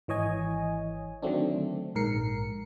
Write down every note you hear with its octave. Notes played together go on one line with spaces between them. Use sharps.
G#1 E3 C#5 D#5 G#5
D3 D#3 F#3 A3 C4 D4
A#1 G#2 A#4 C7 C#7